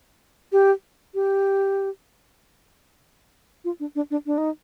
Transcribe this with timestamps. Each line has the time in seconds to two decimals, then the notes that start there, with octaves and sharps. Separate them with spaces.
0.52 G4
1.15 G4
3.65 F4
3.80 D4
3.95 D4
4.11 D4
4.26 D4
4.38 D#4